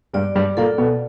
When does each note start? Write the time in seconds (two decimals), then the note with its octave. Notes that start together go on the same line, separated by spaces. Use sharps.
0.13 G2 G3 D5
0.35 G2 G3
0.57 A#2 A#3 A4
0.78 B2 B3